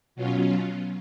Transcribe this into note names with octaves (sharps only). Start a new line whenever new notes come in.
B2 F#3 C#4 F4